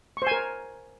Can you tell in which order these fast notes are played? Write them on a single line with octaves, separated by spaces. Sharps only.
C#6 C5 G#5 A#4